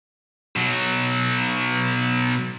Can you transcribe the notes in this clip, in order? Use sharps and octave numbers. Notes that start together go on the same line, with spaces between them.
B2 F#3